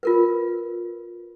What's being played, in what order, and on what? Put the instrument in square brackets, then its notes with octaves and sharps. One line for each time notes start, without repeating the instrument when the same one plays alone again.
[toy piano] F4 A#4 B4